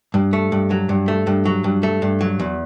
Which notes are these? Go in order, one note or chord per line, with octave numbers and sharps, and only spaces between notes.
G2
A3
G2
F#3
G2
A3
G2
F#3
G2
A3
G2
F#3
E2